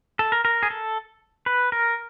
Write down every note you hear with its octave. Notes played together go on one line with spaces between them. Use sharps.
A4
A#4
A#4
G#4
A4
B4
A#4